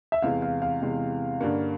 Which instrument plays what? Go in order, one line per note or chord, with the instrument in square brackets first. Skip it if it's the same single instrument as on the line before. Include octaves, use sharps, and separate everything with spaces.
[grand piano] E5
[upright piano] E2 C3 E3 G#3 [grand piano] F5
[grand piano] F5
F5
[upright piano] E2 C3 E3 G#3
G2 D3 G3 A#3 C#4